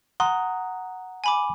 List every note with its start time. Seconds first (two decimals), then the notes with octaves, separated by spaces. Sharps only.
0.20 F#5 A#5 C6 D#6
1.24 G#5 B5 D6